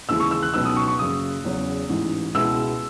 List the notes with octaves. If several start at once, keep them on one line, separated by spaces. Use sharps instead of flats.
D#2 C#3 E3 G#3 E6
C#6
E6
F#6
C#2 B2 F#3 B3 D#4 E6
D#6
C#6
C#6
F#1 F#2 C#3 D#6
E2 C#3 F#3 C#4
A1 G#2 E3
C#2 B2 G#3 B3 E4 E6